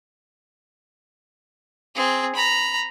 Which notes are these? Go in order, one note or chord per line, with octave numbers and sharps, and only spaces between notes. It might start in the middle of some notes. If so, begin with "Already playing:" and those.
C4 G#4
A#5 B5